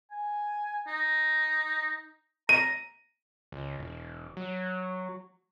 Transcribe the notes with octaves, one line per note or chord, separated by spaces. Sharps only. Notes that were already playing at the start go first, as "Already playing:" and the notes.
G#5
D#4
A#5 D#7
C#2
E1
F#3